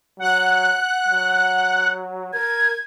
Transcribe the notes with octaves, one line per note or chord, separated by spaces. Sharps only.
F#3 F#5 F#6
F#3
A#4 G#6